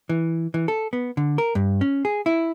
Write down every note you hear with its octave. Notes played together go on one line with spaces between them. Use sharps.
E3
E3
A4
B3
D3
A#4
G2
C#4
G#4
E4